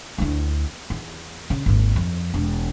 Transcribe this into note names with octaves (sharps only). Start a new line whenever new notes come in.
D2 E4
E2
C#3
G#1 D#2
F2
E1